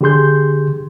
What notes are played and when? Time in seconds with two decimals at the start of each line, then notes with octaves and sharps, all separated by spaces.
0.01 D3 G4 G#4 C6 G6